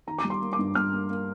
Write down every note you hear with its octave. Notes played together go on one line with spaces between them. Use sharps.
D#3 A#5
D6
G3
C6
A#3
D6
G2
G2 F6
A#3
A#3